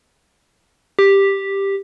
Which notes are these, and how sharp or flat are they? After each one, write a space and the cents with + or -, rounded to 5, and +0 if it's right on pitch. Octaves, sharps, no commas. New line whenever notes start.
G4 +5